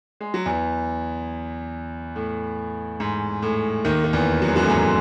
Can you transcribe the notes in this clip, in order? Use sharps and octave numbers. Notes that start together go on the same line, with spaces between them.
G#3
F#3
E2 E3
A2
G#2
A2
D#2 D#3
D#3
E2 E3
F#3
G#3
F#2 F#3
A3
G#2 G#3